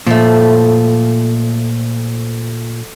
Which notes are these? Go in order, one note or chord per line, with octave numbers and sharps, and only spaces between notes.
A#2 F3 A3